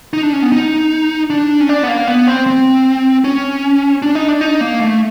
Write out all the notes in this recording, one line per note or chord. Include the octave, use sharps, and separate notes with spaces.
D#4
D4
C#4
B3
D#4
D4
C#4
D4
B3
A#3
B3
C4
C4
C#4
D4
D#4
D4
D#4
A#3
A3